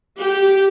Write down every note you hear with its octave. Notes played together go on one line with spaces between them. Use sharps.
G4